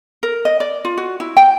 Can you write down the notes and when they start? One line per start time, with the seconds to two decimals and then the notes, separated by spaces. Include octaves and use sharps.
0.23 A#4
0.45 D#5
0.60 D5
0.85 F4
0.97 F#4
1.20 E4
1.37 G5